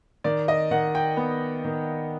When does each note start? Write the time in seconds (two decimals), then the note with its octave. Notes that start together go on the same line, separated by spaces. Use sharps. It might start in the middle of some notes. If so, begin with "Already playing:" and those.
0.24 D#3 D5
0.48 D#5
0.71 D#3 F#5
0.95 G5
1.17 B3
1.64 D#3